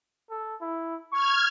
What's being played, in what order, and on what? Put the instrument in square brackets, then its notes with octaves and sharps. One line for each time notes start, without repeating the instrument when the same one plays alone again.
[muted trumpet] A4
E4
[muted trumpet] C#6 [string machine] F6 G#6